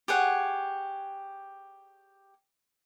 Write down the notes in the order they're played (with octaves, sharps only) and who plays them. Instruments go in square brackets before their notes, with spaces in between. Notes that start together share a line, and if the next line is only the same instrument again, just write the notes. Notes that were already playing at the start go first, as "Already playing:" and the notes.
[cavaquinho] G4 G#4 C#5 F#5